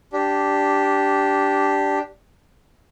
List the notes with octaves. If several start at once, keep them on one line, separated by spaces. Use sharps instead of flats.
D4 G4